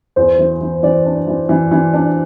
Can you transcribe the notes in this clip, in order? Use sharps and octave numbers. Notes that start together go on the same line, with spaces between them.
E2 C5
E3
E3
E3 D5
D4
E3
E3
E3
D4